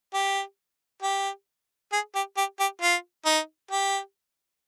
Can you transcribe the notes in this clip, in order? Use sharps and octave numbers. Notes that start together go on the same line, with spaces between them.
G4
G4
G#4
G4
G4
G4
F4
D#4
G4